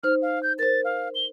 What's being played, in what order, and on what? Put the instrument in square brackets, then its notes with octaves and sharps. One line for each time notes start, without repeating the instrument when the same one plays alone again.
[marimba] D#4 C5 [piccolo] F6
[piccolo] F5
G6
[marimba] A#4 C5 [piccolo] A6
[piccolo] F5
G7